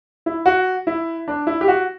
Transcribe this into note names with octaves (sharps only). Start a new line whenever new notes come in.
E4
F#4
E4
D4
E4
G4
F#4